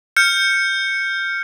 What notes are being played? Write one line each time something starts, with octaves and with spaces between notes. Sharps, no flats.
F6 G6 C#7